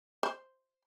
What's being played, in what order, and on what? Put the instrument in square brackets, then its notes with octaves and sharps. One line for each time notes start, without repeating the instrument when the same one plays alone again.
[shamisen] C5